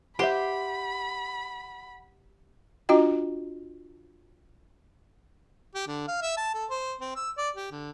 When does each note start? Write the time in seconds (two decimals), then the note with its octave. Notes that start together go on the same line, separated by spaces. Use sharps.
0.19 G4 B4 C5 E5 F#5 B5 C6
2.89 D4 F4 F#4 D#5 G5
5.74 G4
5.87 D3
6.08 F5
6.22 E5
6.37 A5
6.54 A4
6.70 C5
7.01 C4
7.16 E6
7.37 D5
7.56 G4
7.71 D3